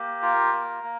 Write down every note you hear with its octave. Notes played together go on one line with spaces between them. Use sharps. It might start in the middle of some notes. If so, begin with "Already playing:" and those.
Already playing: A#3 G4
F4 A#4
A#3
A#3